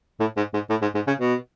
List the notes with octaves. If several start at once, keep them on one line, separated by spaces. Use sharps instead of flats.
A2
G#2
G#2
A2
G#2
G#2
C#3
B2